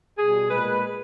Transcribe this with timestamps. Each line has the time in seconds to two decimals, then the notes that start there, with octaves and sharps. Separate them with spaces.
0.18 B2 G3 G#4
0.50 A#2 G#3 B4